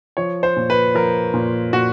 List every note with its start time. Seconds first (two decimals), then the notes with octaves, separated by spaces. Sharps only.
0.17 F3 C#5
0.43 C5
0.56 A#2
0.70 B4
0.95 F3 A#4
1.34 A#2
1.73 A#2 F#4